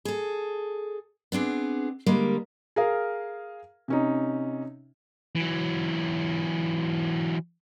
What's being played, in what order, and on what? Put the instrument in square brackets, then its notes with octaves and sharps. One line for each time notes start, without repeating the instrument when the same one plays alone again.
[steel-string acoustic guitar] G#4 A4
B3 C4 D4 G#4
D3 G3 G#3 A#3 A#4
[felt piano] G#4 A#4 F5
C3 C#4 D#4
[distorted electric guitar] E3 F#3